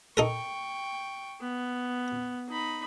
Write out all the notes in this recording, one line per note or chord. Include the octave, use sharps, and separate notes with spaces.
D#4 A4 A#4 G5 C#6
B3
D#4 B5